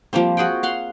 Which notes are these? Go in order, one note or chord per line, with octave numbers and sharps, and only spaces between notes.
F3 G3 A#3 C4
F#4 G#4 F#5 G5
F5 F#5 C6